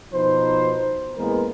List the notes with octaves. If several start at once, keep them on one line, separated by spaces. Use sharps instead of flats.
B2 F3 D#4 B4 C5
A1 E2 G#3 A#3 B3 A#4